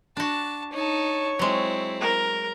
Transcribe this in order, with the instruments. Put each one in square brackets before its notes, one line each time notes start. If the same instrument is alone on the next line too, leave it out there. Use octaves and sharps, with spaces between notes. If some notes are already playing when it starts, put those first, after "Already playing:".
[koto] D4 F#4 [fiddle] A5
[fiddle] D#4 A5 [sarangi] C#5
[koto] F#3 G#3 [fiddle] C4 E4
[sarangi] A#4